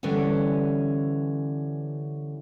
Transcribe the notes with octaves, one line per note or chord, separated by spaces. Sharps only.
D3 E3 G3 B3 C#4